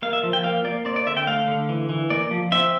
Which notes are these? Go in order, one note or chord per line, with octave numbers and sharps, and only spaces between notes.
A#3 F5
E5
F3
G5
A#3 F5
A#3 D5
C4 D5
D5
D3 E5
G5
A3 F5
D3
E3
E3
A#3 D5
F3
C4 E5